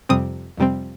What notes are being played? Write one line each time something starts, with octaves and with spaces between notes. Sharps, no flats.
F2 C3 G3 C4 D#6
F2 C3 G3 C4